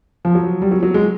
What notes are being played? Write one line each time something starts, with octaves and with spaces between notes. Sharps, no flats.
F3
F#3
G3
F#3
F#3
G#3